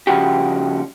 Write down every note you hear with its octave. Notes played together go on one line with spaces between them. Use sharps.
G2 C#3 F3 F#4 G4